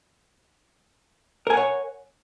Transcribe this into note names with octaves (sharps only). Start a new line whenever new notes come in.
A#4 C#5 F#5 G#5